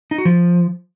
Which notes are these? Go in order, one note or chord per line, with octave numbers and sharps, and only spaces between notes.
D#4
F#4
F3